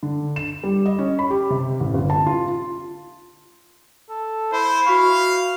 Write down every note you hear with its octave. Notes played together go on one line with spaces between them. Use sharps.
D3
E7
G3
D#5
C#4
B5
G4
C3
A1
G1
A5
F4
A4
E4 C5
F#4 F5 C#6